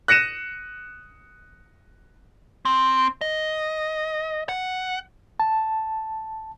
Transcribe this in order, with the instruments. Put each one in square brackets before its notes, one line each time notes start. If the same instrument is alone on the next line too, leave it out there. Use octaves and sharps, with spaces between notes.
[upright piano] F#6 A#6 C#7 D#7 E7
[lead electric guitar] C4
D#5
F#5
[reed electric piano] A5